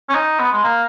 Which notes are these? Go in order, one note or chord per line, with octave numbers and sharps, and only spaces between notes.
C#4
D#4
B3
G#3
A#3